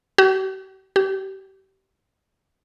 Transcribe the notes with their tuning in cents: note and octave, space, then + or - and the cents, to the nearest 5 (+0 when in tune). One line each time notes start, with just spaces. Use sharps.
G4 -45
G4 -30